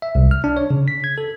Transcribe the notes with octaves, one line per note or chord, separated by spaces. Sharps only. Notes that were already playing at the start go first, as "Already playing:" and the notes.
E5
C2
F6
D4
C#5
C#3
B6
G#6
A4